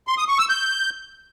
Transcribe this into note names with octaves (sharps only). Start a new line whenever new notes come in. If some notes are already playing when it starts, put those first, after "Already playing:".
C6
D#6
C#6
E6
G6